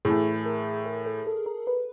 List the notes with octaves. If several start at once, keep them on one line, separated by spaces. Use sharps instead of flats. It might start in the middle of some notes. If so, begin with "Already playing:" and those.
A2 E3 A3 G#4
A#4
A#4
A4
A4
A#4
B4